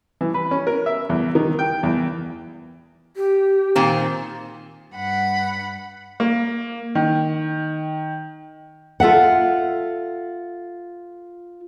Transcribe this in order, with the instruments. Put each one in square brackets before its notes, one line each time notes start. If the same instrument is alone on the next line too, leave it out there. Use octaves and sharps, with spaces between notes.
[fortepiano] E3
B4
C#4
A#4
E5
E2
D#3
G5
E2
[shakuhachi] G4
[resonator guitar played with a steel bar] A#2 D#3 C4
[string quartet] G2 F#5 B5
[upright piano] A#3
D#3
[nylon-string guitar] F4 A4 E5 F#5